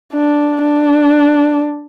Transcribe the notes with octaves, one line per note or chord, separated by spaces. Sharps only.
D4
D4